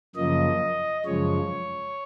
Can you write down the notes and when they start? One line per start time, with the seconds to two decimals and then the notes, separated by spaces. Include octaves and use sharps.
0.15 F#2 C#3 F3 A#3 D#5
1.05 F#2 C#3 F3 G#3 C#5